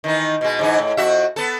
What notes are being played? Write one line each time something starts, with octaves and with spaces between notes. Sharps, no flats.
D#3 E3 D#4
B2 G#3
G#2 E3 D#4
A2
F2 F#4 E5
B3 A4